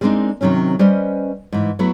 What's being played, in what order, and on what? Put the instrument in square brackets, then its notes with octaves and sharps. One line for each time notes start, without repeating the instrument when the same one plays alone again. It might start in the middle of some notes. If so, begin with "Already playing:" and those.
[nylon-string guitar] G3 G#3 A#3 C4 D4 D#4
C3 D#3 F#3 C4 C#4
G3 C#4 B4 C5 D#5
G#2 E3
F#3 A3 B3 E4